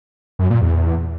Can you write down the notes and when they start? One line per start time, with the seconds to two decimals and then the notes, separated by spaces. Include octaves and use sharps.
0.39 F#2
0.50 A#2
0.61 E2